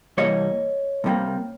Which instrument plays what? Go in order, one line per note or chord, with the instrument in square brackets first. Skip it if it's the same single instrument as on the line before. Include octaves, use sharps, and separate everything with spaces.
[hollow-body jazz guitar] C2 C3 E3 G3 A#3 C#5 D#5
C2 C3 E3 G3 A#3